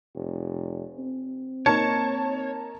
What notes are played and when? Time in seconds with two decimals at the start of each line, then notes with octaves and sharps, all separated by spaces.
0.15 F1
0.99 C4
1.66 A#3 D#4 A#4 C#5 A5